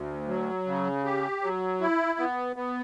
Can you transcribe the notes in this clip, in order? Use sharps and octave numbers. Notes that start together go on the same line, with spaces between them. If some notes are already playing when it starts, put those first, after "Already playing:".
Already playing: D2
F#3
C#3
G4
F#3
E4
B3
B3